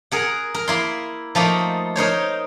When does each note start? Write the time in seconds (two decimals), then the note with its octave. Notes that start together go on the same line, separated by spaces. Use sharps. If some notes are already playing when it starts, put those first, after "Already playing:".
0.12 G#4 A#4 F#5
0.54 A#4
0.68 A#3 E4 C6
1.35 F3 A3 A#3 D#4
1.96 D#4 A#4 C5 C#5